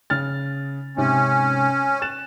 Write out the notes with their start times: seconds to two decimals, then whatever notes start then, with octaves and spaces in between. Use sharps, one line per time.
0.10 C#3 F6 A6
0.97 G#2 C3 C#4
2.02 F#6 A6 E7